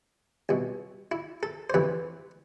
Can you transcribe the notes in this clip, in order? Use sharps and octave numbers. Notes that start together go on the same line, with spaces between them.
C2 B2
E4
A4
C5
D2 C3 E3 B4